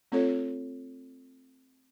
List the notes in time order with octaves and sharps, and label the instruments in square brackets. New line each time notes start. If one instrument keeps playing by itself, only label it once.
[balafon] A3 C4 F4 A4 C#5